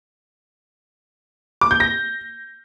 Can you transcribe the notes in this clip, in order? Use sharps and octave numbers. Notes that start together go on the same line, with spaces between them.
D6
G6
A#6